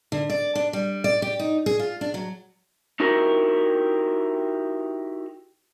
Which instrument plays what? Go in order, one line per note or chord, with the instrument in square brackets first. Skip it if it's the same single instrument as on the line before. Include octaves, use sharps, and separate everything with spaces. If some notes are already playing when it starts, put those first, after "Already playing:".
[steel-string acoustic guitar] D3
D5
D4
G3
D5
G4
D#4
G#4
F4
D4
F#3
[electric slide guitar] D#4 E4 F#4 G4 A#4